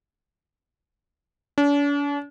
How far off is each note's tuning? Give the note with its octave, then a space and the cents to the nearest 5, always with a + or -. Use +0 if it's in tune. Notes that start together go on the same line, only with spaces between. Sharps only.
D4 -45